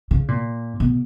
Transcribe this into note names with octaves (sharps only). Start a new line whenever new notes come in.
C#3
A#2
B2